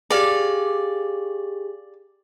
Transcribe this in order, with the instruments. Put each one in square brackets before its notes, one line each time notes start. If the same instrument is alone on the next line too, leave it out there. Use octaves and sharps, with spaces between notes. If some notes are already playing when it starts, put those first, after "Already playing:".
[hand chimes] G4 G#4 [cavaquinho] D5 F5